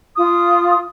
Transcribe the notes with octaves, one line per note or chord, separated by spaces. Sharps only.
F4 D#6